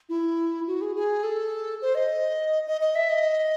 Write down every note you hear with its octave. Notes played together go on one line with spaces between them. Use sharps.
E4
F#4
G#4
G#4
A4
C5
D#5
D#5
D#5
E5
D#5